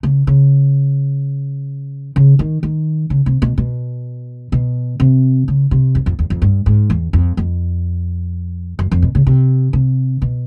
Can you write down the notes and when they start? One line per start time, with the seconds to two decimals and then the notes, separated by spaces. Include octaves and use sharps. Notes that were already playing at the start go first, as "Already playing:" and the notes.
0.03 C#3
0.27 C#3
2.16 C#3
2.39 D#3
2.63 D#3
3.10 C#3
3.26 C3
3.42 B2
3.58 B2
4.52 B2
5.00 C3
5.48 C#3
5.71 C3
5.95 F#2
6.06 F2
6.19 E2
6.30 F2
6.42 G2
6.66 G#2
6.90 E2
7.13 F2
7.37 F2
8.79 F#2
8.92 F2
9.02 B2
9.15 C#3
9.27 C3
9.73 C3
10.22 B2